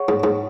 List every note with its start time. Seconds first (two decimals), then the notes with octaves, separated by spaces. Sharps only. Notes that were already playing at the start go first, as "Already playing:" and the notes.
Already playing: G#4 C#5 F#5 C#6
0.09 G#2
0.24 G#2